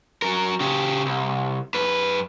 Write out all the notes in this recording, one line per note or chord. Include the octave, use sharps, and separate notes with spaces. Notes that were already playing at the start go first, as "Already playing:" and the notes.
F#3 A#4
C#3 G4
C2
F#2 B4